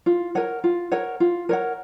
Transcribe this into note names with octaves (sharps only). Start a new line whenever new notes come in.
F4
A#4 C#5 F#5
F4
A#4 C#5 F#5
F4
A#4 C#5 F#5